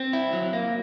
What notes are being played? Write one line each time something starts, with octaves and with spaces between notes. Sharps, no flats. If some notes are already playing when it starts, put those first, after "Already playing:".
Already playing: C4
E4
F#3
A#3